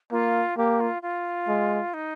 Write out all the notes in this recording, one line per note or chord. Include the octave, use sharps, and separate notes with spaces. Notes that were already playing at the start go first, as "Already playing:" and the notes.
A#3 F4
A#3 G4
F4
F4
G#3
D#4